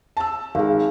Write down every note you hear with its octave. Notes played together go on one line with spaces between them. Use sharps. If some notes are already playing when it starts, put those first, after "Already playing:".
A5 E6
G#1 G#4 F5